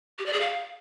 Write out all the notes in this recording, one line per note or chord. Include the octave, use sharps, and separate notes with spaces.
G4
D5
G#4
F5